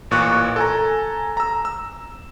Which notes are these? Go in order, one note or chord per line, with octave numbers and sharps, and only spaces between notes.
A1 A#2 C#6 F#6
A4 G#5 A#5
A#5 E6
E6